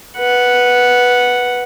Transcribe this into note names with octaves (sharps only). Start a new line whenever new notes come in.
B4 F#5